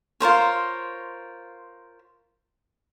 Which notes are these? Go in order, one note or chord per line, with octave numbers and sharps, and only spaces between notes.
F4 A#4 C5 C#5